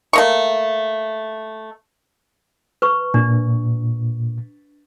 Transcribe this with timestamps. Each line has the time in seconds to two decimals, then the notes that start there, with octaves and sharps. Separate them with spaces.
0.13 A3 A#3 C#6
2.82 B4 C#6
3.14 A#2 D4